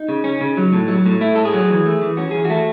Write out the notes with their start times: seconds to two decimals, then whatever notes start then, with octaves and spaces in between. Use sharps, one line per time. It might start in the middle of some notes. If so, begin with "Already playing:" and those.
Already playing: D#4
0.09 C#3
0.24 C#4
0.41 C#3
0.57 F#3
0.73 A2
0.88 F#3
1.06 A2
1.21 A3 E4
1.35 A2 A4
1.45 G#4
1.54 F#3
1.69 E3
1.85 A3
2.01 E3
2.17 C#4 F#4
2.31 E3 G#4
2.45 F#4
2.50 A3